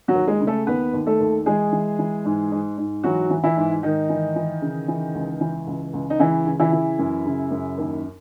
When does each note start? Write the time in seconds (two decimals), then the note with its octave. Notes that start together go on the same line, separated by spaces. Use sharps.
0.08 F#3 F#4
0.15 D#2
0.27 G#3 G#4
0.41 C#3
0.47 A3 A4
0.67 D#2 B3 B4
0.93 D#2
1.07 A3 A4
1.20 D#2
1.46 E3 G#3 G#4
1.72 E3
1.99 E3
2.25 G#2
2.52 G#2
2.78 G#2
3.03 E3 F#3 F#4
3.30 E3
3.43 E3 E4
3.57 G#2
3.83 G#2 D#3 D#4
4.09 E3
4.36 E3
4.62 C#3
4.88 E3
5.14 C#2
5.41 E3
5.67 C#2
5.93 C#2
6.10 D#4
6.20 C#3 E3 E4
6.46 C#3
6.59 E3 E4
6.73 E3
6.99 F#2
7.25 C#3
7.51 F#2
7.78 D#2